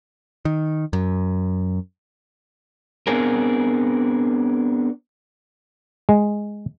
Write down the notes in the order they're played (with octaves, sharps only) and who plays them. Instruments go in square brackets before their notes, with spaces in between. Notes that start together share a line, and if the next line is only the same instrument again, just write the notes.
[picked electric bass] D#3
F#2
[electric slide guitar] B3 C4 D4 G#4 A#4
[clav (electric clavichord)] G#3